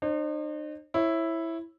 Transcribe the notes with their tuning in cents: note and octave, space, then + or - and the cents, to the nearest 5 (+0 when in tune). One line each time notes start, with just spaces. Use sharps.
D#4 -45 C5 +35
E4 +0 C#5 -30